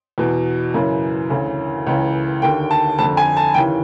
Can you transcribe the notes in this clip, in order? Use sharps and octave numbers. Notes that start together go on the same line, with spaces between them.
E2 B2
F#2 C#3 E3
D2 C#3 E3
C#2 C#3 E3
D#2 D3 G5
A5
F2 D3 A5
G#5
A5
D#2 C#3 E3 G5